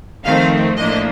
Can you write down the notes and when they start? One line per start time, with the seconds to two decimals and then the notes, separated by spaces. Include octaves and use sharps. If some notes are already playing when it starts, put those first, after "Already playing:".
0.24 F2 D#3 A3 C4 F5
0.77 A2 F3 A#3 D4 D#5